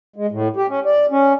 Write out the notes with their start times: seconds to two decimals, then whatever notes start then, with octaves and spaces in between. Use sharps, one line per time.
0.16 G#3
0.32 A2
0.56 G4
0.69 C#4
0.86 D5
1.11 C#4